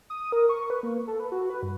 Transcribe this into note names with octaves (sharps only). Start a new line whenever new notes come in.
D#6
A#4
C#6
B4
A#3
A4
B4
F#4
B4
G2